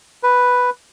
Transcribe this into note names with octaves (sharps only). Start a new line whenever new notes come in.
B4